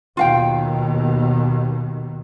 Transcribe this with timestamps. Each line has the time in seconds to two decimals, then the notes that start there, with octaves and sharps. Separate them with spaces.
0.17 D#2 B2 D#3 F4 F5 G5